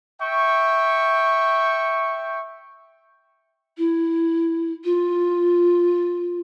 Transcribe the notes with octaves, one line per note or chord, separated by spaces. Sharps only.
E5 G5 C#6
E4
F4